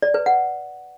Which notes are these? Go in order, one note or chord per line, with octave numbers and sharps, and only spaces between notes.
D5
B4
F#5